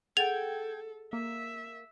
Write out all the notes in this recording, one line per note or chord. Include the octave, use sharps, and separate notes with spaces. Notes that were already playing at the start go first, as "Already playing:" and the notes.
G#4 A4 F#5 G5 G#6 A6 F7
A#3 E5